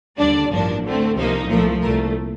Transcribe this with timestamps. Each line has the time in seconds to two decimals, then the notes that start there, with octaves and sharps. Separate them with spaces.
0.18 D#2 D3 G3 D4 D5
0.51 A1 G2 F3 A#3 D4
0.84 D2 D3 A3 C4
1.17 C2 C3 F3 A#3 D#4 C5
1.49 C2 A#2 F3 A3 A#4
1.82 C2 A#2 A3 A#4